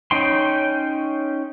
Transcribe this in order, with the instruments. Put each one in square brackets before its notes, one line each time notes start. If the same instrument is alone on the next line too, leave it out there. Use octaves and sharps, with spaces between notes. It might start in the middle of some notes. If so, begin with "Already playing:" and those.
[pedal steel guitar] C#4 D#4 G5 C6